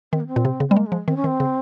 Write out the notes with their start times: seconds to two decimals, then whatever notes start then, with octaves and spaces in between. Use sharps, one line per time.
0.12 D#3 C4
0.20 A#3
0.27 C4
0.36 A#2
0.45 C3
0.60 C#3
0.68 G3 C4
0.76 G#3 A#3
0.86 G#3
0.92 F3
1.08 D#3 C4
1.16 C#4
1.24 D#3 C4
1.40 C#3